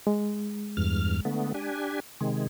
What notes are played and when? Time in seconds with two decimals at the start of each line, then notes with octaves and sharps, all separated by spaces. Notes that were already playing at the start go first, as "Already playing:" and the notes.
0.07 G#3
0.77 E2 G2 F6
1.25 D3 A3 B3
1.54 D4 G4 G#5
2.21 C3 D#3 G#3